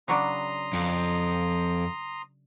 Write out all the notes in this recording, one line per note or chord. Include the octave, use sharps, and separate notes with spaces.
C#3 F#3 D4 A#5 C6 D#6
F2